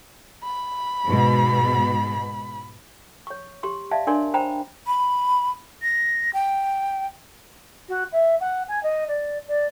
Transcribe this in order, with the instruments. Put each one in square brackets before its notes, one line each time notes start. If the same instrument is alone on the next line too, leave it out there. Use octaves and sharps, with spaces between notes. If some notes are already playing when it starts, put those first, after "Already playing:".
[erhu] B5
[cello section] G#2 B2
[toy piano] C#5 C#6
G4 C6 C#6
D5 E5 F5 A5
D4 A#4 C#5 D5 G#5 C6
C5 G5 A#5 B5
[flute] B5
A#6
G5
[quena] F#4
E5
F#5
G#5
D#5
D5
D5